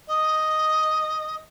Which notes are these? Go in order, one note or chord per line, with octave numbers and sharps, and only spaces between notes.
D#5